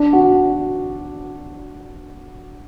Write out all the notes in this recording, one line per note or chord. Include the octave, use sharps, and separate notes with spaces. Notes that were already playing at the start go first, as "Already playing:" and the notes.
Already playing: D4
F#4